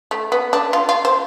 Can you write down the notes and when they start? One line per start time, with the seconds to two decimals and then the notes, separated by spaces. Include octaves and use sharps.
0.11 A3
0.32 B3
0.53 D4
0.73 F4
0.89 F4
1.05 C5